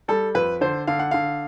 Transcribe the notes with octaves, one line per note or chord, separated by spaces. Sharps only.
G3 A4
F2 B4
D3 C5
D3 F5
F#5
D3 F5